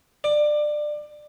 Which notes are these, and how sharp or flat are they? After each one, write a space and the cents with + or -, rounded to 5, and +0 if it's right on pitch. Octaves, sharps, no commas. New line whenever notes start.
D5 +20